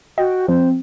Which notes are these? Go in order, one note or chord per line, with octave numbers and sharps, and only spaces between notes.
F#4 D#5 G5
F3 C4 C5